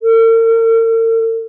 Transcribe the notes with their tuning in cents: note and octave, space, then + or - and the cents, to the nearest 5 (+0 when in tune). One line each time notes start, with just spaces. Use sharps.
A#4 -45